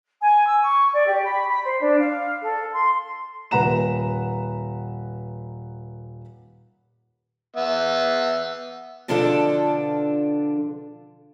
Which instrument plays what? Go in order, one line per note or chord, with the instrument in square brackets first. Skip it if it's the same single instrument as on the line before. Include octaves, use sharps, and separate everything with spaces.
[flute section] G#5
E6
C#6
D5
G4
B5
B5
C5
D4
F5
A4
C6
[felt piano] D#1 B4 F#5 A#5 E7
[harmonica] B3 E5
[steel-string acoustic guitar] B2 D3 F3 D4 F4 A4